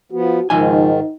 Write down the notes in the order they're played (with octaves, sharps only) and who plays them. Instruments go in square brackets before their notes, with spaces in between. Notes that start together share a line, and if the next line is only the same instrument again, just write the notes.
[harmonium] F3 B3 [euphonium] F#4
[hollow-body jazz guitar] C#2 F3 G#5 [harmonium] G#2 D#3 [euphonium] D#4